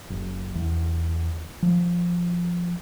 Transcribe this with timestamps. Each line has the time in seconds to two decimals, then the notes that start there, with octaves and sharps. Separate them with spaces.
0.10 F#1
0.55 E2
1.62 F3